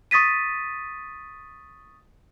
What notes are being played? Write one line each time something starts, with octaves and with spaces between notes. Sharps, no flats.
C#6 D#6 A6 B6 D#7